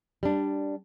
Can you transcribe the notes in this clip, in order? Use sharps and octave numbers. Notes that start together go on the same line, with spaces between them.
G3 D4